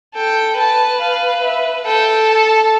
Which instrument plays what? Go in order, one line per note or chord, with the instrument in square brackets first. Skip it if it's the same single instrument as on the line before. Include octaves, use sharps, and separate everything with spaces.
[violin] A4 [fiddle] G5
[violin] B4 [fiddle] A5
[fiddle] F5
E5
[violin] A4 [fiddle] G5
[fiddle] A5